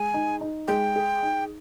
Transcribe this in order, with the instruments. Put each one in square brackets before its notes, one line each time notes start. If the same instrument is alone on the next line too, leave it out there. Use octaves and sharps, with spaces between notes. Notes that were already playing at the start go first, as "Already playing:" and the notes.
Already playing: [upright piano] G#3 [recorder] G#5
[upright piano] D#4
D#4
[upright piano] G#3 [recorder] G5
[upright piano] G#4
D#4